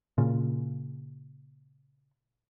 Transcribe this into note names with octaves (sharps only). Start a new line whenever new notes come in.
A#2 C#3